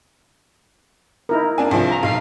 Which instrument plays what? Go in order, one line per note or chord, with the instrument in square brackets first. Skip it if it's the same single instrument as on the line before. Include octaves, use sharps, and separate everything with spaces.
[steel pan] D#4 E4 A#4
[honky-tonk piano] A#3 D4 G#5
C2 G2 F3
[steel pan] A#5
[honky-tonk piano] B1 [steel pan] F5